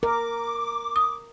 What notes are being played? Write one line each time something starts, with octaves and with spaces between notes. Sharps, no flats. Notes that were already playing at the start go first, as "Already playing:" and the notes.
A#4 D6
D#6